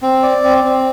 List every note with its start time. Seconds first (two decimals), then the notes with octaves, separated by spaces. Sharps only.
0.02 C4
0.23 D5
0.44 C4
0.64 C4